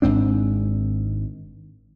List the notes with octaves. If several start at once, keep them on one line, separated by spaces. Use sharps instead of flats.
G#1 G#2 C4 D4